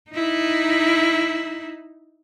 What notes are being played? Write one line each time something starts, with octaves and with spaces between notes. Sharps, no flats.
D#4 E4